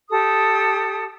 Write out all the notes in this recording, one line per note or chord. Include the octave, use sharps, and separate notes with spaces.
G4 A4 D#6